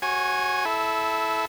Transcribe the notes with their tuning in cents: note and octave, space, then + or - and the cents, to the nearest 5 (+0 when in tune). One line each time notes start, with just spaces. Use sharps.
F#4 +0 C#5 -35 G#5 +0
E4 +0 A4 -20